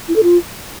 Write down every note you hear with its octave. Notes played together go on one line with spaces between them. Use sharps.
E4
A4
F4